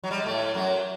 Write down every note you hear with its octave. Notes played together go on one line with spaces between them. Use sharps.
F#3
G3
G#3
A2 A3
F#2 F#3